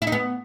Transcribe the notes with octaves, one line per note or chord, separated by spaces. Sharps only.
E4
D#4
B3